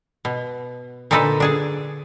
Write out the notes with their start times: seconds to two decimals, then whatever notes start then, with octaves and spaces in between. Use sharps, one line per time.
0.25 B2
1.11 A#2 D3 D#4 A4 B4 D#5
1.40 D4 G#4 A5